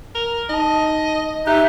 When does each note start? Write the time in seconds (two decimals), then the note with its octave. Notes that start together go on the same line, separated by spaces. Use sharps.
0.15 A#4
0.49 D#4 D#5 A5
1.47 D#4 G4 E5 F#6